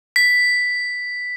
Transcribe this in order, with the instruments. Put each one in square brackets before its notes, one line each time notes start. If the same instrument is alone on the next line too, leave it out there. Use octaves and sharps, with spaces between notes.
[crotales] B6